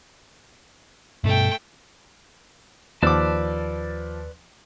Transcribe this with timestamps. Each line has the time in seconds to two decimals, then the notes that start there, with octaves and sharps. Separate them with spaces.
1.24 G2 B2 A3 G5
3.03 D#2 F3 B4 D5 A5 D6 E6